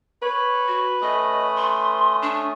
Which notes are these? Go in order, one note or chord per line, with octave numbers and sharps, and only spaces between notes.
B4 C#5
F#4
A3 C#4 D#5 D#6
C6
D4